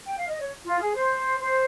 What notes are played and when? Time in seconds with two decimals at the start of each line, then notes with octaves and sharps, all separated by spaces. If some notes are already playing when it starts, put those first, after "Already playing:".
0.06 G5
0.17 F5
0.28 D#5
0.39 C#5
0.65 F4
0.80 G#4
0.94 C5
1.39 C5